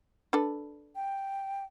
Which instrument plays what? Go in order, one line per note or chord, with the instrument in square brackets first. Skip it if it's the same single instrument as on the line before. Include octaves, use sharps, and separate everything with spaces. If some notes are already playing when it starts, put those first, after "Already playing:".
[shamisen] D4 A4 B4
[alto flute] G5